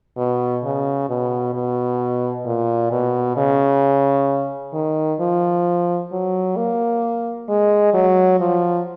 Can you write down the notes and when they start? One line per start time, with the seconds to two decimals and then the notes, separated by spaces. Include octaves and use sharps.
0.17 B2
0.64 C#3
1.09 B2
1.54 B2
2.45 A#2
2.91 B2
3.37 C#3
4.74 D#3
5.20 F3
6.12 F#3
6.56 A#3
7.49 G#3
7.94 F#3
8.40 F3